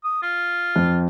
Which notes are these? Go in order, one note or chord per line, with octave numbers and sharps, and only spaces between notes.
D#6
F4
F2